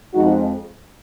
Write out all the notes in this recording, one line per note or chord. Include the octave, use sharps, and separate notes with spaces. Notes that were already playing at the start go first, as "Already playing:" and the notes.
F2 F3 G#3 D#4 F#4